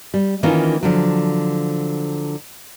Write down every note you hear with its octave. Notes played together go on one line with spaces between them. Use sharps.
G3
D#3 E3 A#3 C#4 D#4 F4
D3 F3 F#3